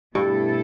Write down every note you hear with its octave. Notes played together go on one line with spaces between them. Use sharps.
G2 B2 A3 E4 A4